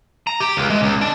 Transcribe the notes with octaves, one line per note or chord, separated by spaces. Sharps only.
A#5
G4
C#2
G#3
C#2
D4